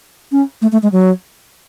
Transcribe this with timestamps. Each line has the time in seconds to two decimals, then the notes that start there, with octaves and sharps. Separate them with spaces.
0.32 C#4
0.62 A3
0.72 A3
0.83 G#3
0.92 F#3